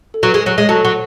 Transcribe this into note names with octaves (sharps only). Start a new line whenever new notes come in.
A4
F#3 B4
G#3
F#3 C#5
G#3
F#3 A4 A5
F#3 F#5